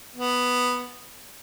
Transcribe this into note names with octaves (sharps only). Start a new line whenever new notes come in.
B3